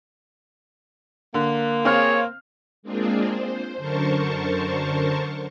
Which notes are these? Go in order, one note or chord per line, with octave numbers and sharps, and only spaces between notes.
D3 A#3
C4 G#4 C#5 F5 F6
G#3 A#3 C4 D4 F4 G#4
C5
F#2 D3 A#4 C5 A5 C#6